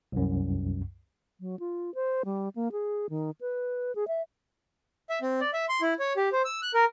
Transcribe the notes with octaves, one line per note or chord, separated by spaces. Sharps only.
C2 F#2
F#3
F4
C5
G3
A#3
G#4
D#3
B4
G#4
E5
E5
C4
D5
E5
C6
E4
C#5
G4
C5
E6
F#6
A#4